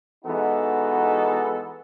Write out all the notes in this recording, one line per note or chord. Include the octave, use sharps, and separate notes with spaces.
E3 G#3 B3 D#4 F#4 A4